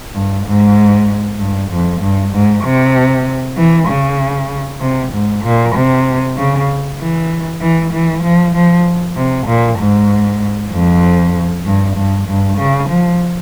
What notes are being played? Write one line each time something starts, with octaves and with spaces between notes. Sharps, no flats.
G2
G#2
G2
F2
G2
G#2
C3
E3
C#3
C3
G#2
A#2
C3
C#3
E3
E3
E3
F3
F3
C3
A#2
G#2
F2
G2
G2
G2
C#3
F3